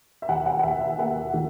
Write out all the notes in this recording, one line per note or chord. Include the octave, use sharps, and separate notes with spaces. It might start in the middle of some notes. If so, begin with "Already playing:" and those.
E5
D#2 F#5
F#5
F#5
D#2 E5
F#5
A#3 F#5
D#3